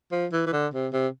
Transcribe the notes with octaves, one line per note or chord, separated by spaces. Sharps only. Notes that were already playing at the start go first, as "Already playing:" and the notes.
F3
E3
E3
D3
C3
C3